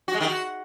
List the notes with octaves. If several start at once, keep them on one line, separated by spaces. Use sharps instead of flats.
F#4
G#3
D#3
F#4